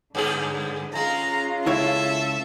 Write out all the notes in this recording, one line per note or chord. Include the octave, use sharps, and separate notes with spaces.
G2 D3 B3 G#4
G#3 C#4 F4 F5 A#5
C#2 E4 A4 C#5 E5 A5